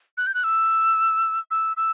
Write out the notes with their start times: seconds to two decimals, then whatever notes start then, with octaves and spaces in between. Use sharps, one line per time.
0.17 F#6
0.27 G6
0.34 F#6
0.44 E6
1.51 E6
1.77 E6